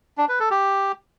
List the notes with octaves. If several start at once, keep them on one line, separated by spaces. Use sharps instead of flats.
D4
B4
A4
G4